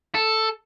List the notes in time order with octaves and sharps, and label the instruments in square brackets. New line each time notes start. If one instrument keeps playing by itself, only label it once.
[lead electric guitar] A4